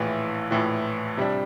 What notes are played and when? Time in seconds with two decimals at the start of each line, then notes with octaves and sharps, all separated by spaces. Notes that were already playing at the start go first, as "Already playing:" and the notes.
Already playing: A#1 A2 E3
0.51 A#1 A2 E3
1.17 C3 G3 D4